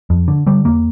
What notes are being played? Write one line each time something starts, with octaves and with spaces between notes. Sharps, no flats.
F2
D3
D3 G3
E2 A#3